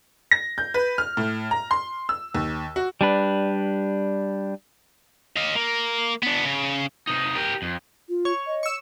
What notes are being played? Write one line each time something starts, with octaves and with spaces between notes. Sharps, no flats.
A#6
G6
B4
F6
A2
A#5
C6
E6
D#2
F#4
G3 D4 B4
D#5 F5
A#3
B3 D4
C#3
C3 D#4
G4 A#4
F2
F4
C#5
D#5
C#6 E6